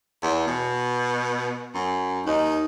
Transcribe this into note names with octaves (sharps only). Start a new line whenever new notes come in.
E2
B2
F#2
D#2 D#4